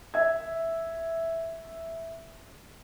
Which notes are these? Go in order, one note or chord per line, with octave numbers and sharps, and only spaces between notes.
E5 G#6